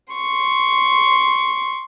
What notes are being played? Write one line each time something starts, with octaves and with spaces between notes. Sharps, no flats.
C6 C#6